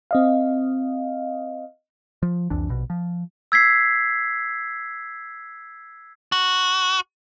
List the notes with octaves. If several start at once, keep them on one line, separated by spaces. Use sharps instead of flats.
C4 D#5 F5
F3
C2 F2 E3 D4
A#1 B2
F3
E6 G#6 B6 C7
F#4